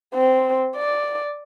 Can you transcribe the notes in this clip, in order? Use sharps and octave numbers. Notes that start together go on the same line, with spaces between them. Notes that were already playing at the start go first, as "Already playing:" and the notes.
C4
D5